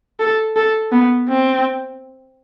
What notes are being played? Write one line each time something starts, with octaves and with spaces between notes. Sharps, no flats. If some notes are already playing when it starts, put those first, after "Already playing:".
A4
A4
B3
C4